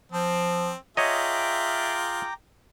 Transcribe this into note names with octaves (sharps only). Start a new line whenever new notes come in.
F3 C4
F4 G#4 C#5 D#5 E5 G5 A#5 D6